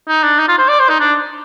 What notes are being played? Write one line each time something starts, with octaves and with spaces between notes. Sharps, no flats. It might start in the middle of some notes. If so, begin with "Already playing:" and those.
D#4
D4
D#4
F4
C5
D5
C5
D#4
D4